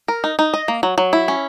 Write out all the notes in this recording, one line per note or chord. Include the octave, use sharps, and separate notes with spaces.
A#4
D#4
D#4
D#5
A#3
F#3
F#3
E4
C#4